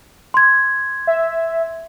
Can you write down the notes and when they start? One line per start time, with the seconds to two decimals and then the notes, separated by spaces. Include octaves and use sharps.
0.34 C6 G#6
1.07 E5